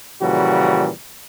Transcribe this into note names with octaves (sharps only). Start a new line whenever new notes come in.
A#2 C#3 E3 F3 G3 F#4